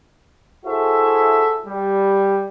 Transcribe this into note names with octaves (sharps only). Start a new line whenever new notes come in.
E4 F#4 G#4 A4 C5 E5
G3